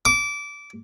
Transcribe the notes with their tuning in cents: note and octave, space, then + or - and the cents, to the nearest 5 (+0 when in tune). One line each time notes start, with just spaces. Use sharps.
D6 -20